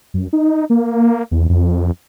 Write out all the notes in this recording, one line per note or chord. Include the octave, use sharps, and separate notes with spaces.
F#2
D#4
A#3
E2
F2